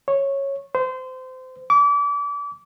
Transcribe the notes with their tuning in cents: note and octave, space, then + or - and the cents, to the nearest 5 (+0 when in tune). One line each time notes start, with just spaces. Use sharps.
C#5 -10
C5 -25
D6 -30